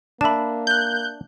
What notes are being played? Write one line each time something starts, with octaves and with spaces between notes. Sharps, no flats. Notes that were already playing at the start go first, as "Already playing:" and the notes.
A#3 D4 E5 A5 B5
F#6 G6